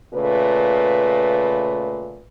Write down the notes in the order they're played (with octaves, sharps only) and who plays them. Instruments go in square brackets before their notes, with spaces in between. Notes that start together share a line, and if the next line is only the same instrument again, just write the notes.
[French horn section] A#2 C#3 A3 B4